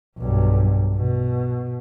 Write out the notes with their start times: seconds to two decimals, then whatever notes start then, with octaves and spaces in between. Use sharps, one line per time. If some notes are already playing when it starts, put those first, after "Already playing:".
0.19 B1 G2
0.96 B2